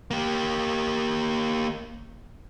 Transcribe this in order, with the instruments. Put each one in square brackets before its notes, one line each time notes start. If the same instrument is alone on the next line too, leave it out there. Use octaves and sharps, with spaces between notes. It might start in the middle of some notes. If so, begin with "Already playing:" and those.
[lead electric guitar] A#3 G4